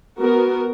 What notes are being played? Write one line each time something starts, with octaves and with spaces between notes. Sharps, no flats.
B3 F#4 A#4